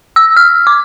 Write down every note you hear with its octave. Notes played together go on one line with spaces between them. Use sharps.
E6
F6
D6